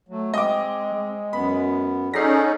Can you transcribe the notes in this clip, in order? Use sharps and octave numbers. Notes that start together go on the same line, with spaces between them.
F#3 A3
G#3 C4 D#5 D6
G#3
F#2 B3 B5
C#4 D#4 G#4 A4 D5 F#5 A#6 C7